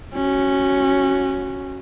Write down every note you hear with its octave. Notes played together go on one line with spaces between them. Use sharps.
C#4 F#4